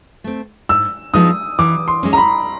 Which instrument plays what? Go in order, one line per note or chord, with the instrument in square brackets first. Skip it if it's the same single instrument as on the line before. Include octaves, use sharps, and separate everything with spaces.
[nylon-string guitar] A3 C4
[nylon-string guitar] G#2 [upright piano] E6
[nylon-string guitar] F3 G#3 B3 D#4 [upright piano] D#6
[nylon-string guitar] E3 [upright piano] D6
[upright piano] C6
[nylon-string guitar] G#3 C#4
[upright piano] A#5
B5